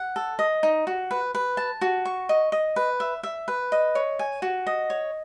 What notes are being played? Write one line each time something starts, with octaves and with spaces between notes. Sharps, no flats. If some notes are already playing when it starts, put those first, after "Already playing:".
Already playing: F#5
A4
D#5
D#4
F#4
B4
B4
A5
F#4
C#6
D#5
D#5
B4
E5
E5
B4
D#5
C#5
G#5
F#4
D#5
C#5